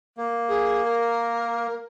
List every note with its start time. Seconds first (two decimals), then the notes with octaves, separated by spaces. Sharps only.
0.17 A#3
0.48 G#4
0.85 A#4